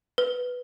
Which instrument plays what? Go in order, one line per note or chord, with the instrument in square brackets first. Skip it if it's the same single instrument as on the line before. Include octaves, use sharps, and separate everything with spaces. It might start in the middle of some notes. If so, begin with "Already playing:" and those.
[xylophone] B4